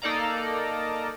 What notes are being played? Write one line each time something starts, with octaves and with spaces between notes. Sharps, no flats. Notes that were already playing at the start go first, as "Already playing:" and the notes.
A#3 D#4 A4 D5 F5 A#5